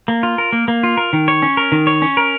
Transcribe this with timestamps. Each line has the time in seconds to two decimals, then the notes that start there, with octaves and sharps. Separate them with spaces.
0.08 A#3
0.23 F4
0.38 A#4
0.53 A#3
0.68 A#3
0.83 F4
0.97 A#4
1.13 D#3
1.28 C#5
1.42 C#4
1.57 A#4
1.72 D#3
1.87 C#5
2.02 C#4
2.17 A#4